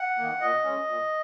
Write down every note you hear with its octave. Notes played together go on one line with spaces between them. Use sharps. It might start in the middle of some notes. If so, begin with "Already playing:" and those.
Already playing: F#5
D#3 A#3
A#2 D#5
G#3 C#4
A#2